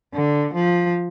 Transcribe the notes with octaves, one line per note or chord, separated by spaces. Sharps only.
D3
F3